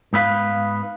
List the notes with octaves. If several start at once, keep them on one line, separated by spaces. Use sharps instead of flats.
G#2 B3 B4 F5